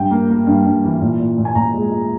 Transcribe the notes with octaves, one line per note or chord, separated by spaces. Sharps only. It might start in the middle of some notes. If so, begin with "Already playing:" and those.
Already playing: G2 G5
A#3
A#3
G2
G2
E3
A#2
A#2
A#2
G#5
A#2 A#5
G#3
G#3